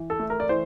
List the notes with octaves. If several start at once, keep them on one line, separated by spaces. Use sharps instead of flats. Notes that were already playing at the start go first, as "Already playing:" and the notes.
Already playing: E3
A4
A3
A#4
D5
E3 C5